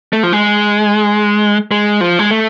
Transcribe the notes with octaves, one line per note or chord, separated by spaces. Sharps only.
A3
F3
G#3
G#3
F3
G#3
A3